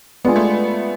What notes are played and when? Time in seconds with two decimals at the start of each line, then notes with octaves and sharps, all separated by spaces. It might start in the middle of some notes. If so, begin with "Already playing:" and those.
0.24 G#3 B3 D4 F4 G#4
0.36 A3